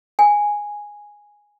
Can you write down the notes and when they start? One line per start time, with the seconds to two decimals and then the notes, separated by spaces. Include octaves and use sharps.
0.19 G#5